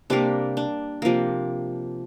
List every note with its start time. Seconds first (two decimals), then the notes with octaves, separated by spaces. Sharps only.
0.10 C3 G3 A#3 D4
0.57 D4
1.02 C3 F3 A#3